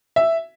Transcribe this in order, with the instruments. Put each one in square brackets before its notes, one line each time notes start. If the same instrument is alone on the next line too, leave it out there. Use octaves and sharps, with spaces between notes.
[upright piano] E5